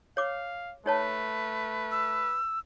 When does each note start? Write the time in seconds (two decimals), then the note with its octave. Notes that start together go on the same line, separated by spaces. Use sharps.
0.17 C#5 F5 D6
0.86 A3 D#4 B4 C#5 A5
1.92 E6